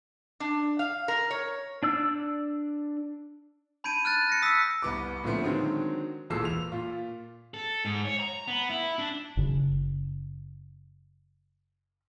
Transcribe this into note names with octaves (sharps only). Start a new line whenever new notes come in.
D4
F5
A#4
C#5
D4 D5 E6
A5 B5 G6 G#6 D7 D#7
F6 F#6 A6
A#6 C#7
D#6 E6 F#6 B6
C2 B3 D6
A#2 D3 F3 A3 B3 C4
D3 D#3 F#3 G#3 C4
E1 E2 A#2 A4 E6 C7
F7
A#2 F4
A4
G#2
C#5
A#5
B3
E4
D4
F#1 C#3